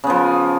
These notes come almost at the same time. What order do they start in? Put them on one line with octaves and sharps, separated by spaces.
C#3 B3 F3